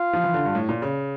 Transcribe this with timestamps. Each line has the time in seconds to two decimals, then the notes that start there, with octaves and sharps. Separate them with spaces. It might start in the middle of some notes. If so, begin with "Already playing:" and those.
Already playing: F4
0.13 F3
0.24 E3
0.34 D3
0.45 G2
0.55 A2
0.69 A#2
0.82 C#3